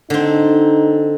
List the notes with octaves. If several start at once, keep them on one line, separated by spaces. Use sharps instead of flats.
D3 C4 D#4